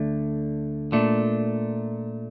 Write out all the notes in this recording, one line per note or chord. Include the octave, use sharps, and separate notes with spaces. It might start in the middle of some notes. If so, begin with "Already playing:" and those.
Already playing: D2 D3 A3
A#2 A3 D4